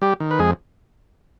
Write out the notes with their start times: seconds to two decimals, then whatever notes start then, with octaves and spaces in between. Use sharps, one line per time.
0.02 G3 G4
0.20 D#3
0.31 B4
0.39 F2 G#3 G#4